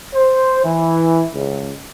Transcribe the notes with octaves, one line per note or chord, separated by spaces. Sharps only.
C5
E3
C#2